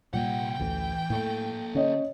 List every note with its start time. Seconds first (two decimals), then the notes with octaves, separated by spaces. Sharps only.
0.13 C2 A#2 G3 A#3 F#5 G5
0.60 A1 D2 E3
1.10 A2 A#3 A4
1.75 D3 C#4 C#5 D#5